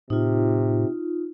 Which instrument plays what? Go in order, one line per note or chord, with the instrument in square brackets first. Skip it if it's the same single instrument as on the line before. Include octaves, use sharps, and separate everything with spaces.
[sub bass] A2 [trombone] C3 [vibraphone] D#4 F4